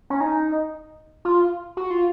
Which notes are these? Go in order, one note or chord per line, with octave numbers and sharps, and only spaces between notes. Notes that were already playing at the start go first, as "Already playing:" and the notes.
C#4
D#4
F4
F#4
F4